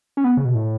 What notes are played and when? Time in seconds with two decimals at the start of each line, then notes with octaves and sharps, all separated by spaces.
0.17 C#4
0.24 B3
0.37 C#3
0.45 B2
0.55 A2